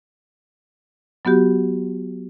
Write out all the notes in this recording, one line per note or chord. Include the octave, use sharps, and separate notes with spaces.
F#3 B3 F#4 G4